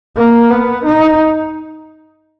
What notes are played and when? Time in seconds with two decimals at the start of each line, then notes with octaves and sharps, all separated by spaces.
0.16 A#3
0.50 B3
0.85 D#4